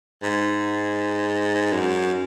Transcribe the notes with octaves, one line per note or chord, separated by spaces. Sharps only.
G#2
F#2